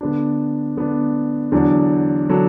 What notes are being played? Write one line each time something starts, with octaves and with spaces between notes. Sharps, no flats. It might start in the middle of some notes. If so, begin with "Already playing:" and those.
D3 B3 D4
D3 B3 D4
E2 D3 F#3 D4 A4
D3 F#3 D4 A4